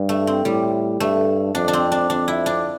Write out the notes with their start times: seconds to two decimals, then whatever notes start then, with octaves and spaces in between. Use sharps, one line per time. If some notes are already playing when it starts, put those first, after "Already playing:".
Already playing: G2
0.09 A3
0.27 C4
0.45 A2 G3
1.00 G2 A3
1.55 F2 D4
1.68 D4
1.73 C4
1.92 D4
2.10 F2 D4
2.28 E4
2.46 D4